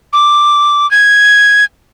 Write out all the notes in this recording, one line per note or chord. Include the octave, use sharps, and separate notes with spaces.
D6
G#6